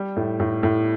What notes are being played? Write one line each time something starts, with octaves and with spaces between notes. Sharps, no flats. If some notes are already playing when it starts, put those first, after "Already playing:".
Already playing: G3
A2
A2
A2